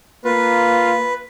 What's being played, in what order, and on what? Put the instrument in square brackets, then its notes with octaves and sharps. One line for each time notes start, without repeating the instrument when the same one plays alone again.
[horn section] A#3 F4 [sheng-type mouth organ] B4